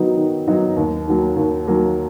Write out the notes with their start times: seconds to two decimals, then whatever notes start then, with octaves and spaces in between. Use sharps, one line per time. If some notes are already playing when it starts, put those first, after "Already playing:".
Already playing: D#3 F#3 B3 D#4 F#4
0.17 D#3
0.48 F#3 B3 D#4 F#4
0.76 D#2
1.07 D#3 F#3 A#3
1.36 D#2
1.68 D#3 F#3 A#3